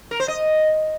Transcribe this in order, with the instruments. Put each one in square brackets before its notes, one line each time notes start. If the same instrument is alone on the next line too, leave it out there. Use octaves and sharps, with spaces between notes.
[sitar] A#4
C5
D#5